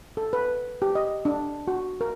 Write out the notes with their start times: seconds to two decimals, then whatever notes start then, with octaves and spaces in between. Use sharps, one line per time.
0.17 A4
0.33 B4
0.82 G4
0.95 D#5
1.25 D4
1.68 F#4
2.01 A#4